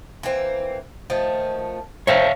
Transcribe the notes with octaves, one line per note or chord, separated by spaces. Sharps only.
E3 A#3 C4
D#3 F3 A3
D#3 C4 A4 C#5 E5 F5